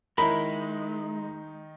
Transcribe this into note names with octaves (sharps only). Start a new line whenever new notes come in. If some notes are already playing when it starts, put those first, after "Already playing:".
D#3 G#3 D#4 E4 A#4 A#5 B5